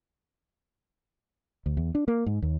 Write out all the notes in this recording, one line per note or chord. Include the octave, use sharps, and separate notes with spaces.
D2
E2
D4
A#3
G#2
D#2